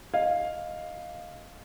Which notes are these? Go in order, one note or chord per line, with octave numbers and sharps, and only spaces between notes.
D#5 F5